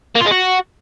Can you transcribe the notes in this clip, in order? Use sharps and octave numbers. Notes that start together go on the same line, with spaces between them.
A#3
F4
G#3
F#4